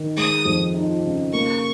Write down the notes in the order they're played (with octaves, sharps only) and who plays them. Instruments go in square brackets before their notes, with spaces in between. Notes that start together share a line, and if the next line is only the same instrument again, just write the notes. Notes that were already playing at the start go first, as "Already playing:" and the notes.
Already playing: [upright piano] D#3
[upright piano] G#3 [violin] D#6
[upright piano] F2
D#4
C#3
[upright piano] A#3 [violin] C#6